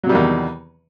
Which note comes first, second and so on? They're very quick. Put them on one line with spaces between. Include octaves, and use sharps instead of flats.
F#3 C3 G3 D#3 E2